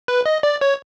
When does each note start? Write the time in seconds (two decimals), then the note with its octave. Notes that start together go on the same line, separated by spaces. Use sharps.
0.08 B4
0.26 D#5
0.43 D5
0.61 C#5